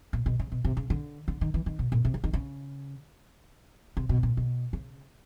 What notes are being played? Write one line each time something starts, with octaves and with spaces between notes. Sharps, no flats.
A#2
B2
C#3
B2
C3
C#3
D3
D3
D#3
E3
D#3
B2
A#2
C3
D3
D#3
C#3
C3
B2
A#2
B2
C#3